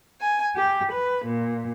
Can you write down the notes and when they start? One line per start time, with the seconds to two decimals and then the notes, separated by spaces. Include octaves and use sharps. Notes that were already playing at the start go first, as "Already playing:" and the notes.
0.21 G#5
0.56 G4
0.92 B4
1.25 A#2